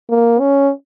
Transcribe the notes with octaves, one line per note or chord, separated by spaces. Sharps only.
A#3
C#4